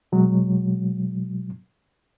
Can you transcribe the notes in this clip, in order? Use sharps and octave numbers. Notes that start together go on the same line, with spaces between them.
B2 F#3 G#3